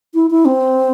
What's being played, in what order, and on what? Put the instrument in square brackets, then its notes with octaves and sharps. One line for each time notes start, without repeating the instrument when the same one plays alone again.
[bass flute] E4
E4
C4